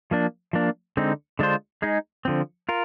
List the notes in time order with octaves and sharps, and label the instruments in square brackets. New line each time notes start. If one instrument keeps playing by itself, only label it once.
[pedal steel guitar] F3 A#3 D4
F3 A#3 D4
D3 G#3 C4 D#4
D3 G#3 D4 F4 C5
G#3 D#4 G#4
D3 F3 C4
F4 A#4